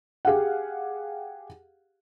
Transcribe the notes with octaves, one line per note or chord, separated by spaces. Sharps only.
G4 G#4 F5 F#5